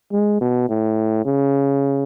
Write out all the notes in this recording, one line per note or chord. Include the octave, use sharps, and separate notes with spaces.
G#3
B2
A2
C#3